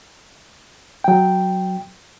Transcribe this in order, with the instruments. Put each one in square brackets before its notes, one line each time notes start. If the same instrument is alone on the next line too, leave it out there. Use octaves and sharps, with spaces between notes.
[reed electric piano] F#3 G5